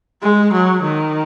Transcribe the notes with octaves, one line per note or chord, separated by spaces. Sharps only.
G#3
F#3
D#3